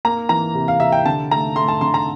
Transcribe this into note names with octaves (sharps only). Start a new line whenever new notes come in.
A#3 A#5
E3 A#5
C3
F5
C3 E5
G5
D3 A5
A3 A#5
A3 C6
A5
D3 C6
A#5